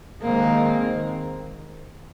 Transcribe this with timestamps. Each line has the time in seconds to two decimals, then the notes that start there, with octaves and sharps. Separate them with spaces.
0.22 D#3 G#3 A#3 C4